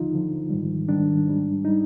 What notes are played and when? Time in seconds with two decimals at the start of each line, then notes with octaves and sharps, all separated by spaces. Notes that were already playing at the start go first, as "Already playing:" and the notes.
Already playing: D#2 D3 F3 D#4 F4
0.12 D#2 D3 F3
0.50 G#2 D#3 G3
0.88 G#2 D#3 G3 D4
1.27 G#2 G3
1.64 G3 D#4